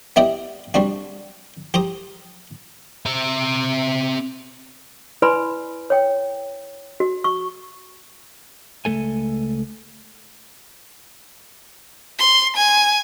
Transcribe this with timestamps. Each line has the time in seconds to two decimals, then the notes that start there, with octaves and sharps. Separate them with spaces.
0.16 B3 E4 G4 D5 D#5 G5
0.74 G3 C4 D4 F#4
1.74 G4 C5 A#5 D#6
3.06 C4 E5
5.22 E4 B4 D5 G#5 B5 C6
5.90 C#5 G5
7.00 F#4
7.24 C#6
8.85 C#2 G#2 A3 A4 G#5
12.19 C6
12.56 G#5